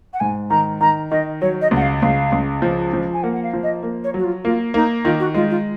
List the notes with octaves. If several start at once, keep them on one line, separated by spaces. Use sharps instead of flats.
F#5
G#2 G#5
D#3 A#5
D#3 A#5
D#3 D#5
F#3 C#5
D#5
C#2 F#5
F5
C#2 F5
C#2
F3
F3
G#5
A#3 F#5
F#5
F5
F3
D#5
A#3
C#5
F#3 F#4
F4
A#3 F4
A#3 D#4
D#3 F4
F#4
G#3 F4
F4